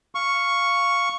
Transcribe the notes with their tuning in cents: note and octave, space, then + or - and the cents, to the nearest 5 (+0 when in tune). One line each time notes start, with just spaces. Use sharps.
F5 +0 C#6 +0